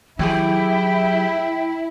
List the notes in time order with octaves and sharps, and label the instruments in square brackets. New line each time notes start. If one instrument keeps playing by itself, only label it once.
[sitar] D#3 G4 G#4 [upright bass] F#3 [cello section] E4 [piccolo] G5